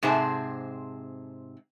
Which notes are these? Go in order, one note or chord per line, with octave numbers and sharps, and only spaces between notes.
G#2 C3 C4 G#4 C5 A5